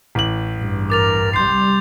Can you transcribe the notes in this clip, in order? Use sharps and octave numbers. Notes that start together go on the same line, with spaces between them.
A1 F#7
E2 G2
A#4 D6 A6 F7
C2 G3 C6 G6 C7